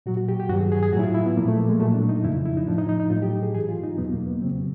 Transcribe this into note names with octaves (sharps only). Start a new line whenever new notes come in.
A#2 F#3 F#4
F#4
G4
G4
G2 D#3 F#3 F#4
G#4
G#4
G#4
A2 F#3 E4 F#4
F4
E4
B3
A#2 F3 A#3
A3
A#3
G#3
A#2 F#3 A3
D4
D#4
F2 C#3 F3 E4
E4
D#4
A2 F3 D4
D#4
D#4
D#4
A2 F#3 F4
G4
G#4
G#2 E3 G#4
F4
D#4
E2 B2 F#3 B3
A#3
B3
F2 C#3 F#3 C4